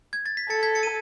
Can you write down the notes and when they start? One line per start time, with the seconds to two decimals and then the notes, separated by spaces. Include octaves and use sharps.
0.13 G#6
0.26 A6
0.37 B6
0.50 A4 A6 C#7
0.63 G#6 B6
0.75 A6 C#7
0.83 D#7